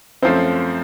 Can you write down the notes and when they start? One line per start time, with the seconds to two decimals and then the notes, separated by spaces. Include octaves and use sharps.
0.22 F#2 F3 A3 C4 C5